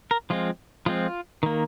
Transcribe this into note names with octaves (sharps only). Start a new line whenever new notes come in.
A#4
F3 G#3 C4 F4
F3 G#3 C4 F4
D#3 A#3